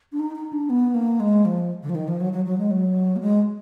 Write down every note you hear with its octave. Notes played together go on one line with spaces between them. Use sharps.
D4
D#4
D#4
D4
B3
A#3
G#3
F3
D3
F3
D#3
F3
F#3
F#3
F#3
G#3
F#3
A#3
G#3